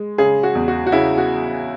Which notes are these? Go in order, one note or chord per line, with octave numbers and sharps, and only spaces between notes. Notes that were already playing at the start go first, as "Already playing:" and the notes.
Already playing: G#3
C#3 G#4
F#4
E2
F#4
F#4
C#3 E4
F#4